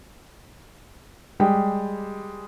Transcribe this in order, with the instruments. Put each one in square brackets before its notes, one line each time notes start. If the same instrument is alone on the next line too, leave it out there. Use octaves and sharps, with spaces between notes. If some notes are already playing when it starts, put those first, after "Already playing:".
[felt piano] G3 G#3 G4 G5